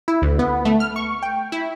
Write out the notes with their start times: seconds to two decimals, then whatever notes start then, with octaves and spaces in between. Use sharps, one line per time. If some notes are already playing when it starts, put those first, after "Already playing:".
0.08 E4
0.22 D2
0.39 B3
0.65 A3
0.80 F6
0.96 C#6
1.23 G5
1.52 E4